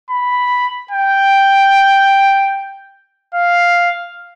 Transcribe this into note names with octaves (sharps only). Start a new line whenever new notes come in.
B5
G5
F5